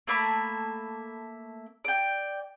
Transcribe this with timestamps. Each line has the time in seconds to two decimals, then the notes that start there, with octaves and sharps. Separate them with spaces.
0.07 A3 A#3 E5 B5
1.84 D5 G5